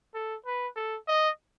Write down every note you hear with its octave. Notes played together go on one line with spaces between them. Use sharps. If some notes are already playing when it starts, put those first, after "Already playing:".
A4
B4
A4
D#5